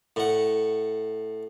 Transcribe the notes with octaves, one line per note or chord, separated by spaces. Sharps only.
A2 F#5